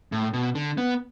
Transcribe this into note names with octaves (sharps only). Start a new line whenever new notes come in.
A2
B2
D3
B3